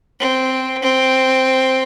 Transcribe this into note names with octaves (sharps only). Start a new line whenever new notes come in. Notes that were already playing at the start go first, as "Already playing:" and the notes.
C4
C4